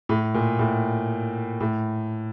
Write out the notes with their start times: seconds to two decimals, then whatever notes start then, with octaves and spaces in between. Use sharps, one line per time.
0.09 A2
0.34 A#2
0.59 A2
1.60 A2